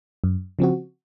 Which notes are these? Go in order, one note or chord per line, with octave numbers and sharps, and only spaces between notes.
F#2
C#3 F3 C4 F#4